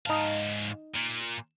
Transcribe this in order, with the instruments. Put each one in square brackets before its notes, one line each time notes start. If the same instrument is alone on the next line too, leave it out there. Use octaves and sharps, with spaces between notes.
[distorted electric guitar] G#2 F5 [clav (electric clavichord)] D#4 A5
[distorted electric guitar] A#2